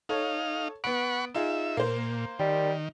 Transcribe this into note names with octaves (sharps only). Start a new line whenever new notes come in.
D#4 A4 C#5 F5
B3 F#5 B5 C#6 D7
D#4 F4 G#4 E5
A#2 A#3 C5
D#3 G3